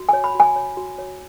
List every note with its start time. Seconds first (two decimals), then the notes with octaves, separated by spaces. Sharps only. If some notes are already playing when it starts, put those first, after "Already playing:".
Already playing: F#4
0.09 C#5 G#5
0.24 B5
0.35 F#4 G#5
0.56 C#5
0.77 F#4
0.98 C#5